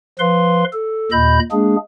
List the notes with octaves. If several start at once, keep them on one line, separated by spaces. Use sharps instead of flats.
F3 B4 F5 C6
A4
D#2 A#2 D#5 B5 G6
G#3 A#3 D4 G#4